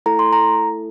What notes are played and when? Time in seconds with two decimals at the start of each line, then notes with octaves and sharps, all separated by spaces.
0.06 A3 E4 A4 A#5
0.19 C6
0.33 A#5